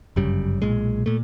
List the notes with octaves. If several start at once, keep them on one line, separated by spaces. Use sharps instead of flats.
G1 F#2 C#3 G3
B1 A#2 G#3
A#2 A3